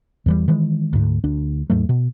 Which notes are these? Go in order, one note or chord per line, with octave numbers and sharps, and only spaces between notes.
E2 E3 G3
D#3 E3 G#3
D2 G#2
D2 D4
D#2 G#2 F#3 A3
B2